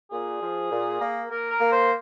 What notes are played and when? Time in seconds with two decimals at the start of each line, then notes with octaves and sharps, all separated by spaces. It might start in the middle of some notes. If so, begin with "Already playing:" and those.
0.12 A#2 G#4
0.42 F3
0.71 A#2
1.00 A#3
1.30 A#3 A#4
1.50 A#4
1.60 A#3
1.70 C5